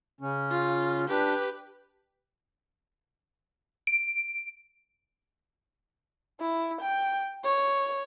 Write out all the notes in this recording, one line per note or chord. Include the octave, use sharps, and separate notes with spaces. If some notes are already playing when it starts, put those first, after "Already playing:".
C#3 C#4
F4
D4 G4 B4
D7
E4
G5
C#5